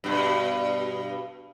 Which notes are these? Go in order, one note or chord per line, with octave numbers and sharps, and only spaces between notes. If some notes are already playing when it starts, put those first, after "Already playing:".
G2 B2